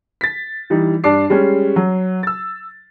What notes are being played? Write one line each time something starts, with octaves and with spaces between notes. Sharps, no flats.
A6 B6
E3 G3 D#4
G2 D4 D5 D6 C7
G3 G#3 C#4
F#3
E6 A6